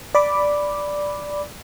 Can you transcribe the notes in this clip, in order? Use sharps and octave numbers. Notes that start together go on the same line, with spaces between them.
D5 B5 D6